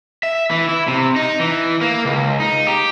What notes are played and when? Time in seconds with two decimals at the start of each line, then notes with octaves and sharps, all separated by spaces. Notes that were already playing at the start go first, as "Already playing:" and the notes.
0.23 E5
0.51 E3
0.69 E4
0.88 C3
1.16 D#4
1.40 E3
1.81 A#3
2.05 C#2
2.40 D#4
2.67 G4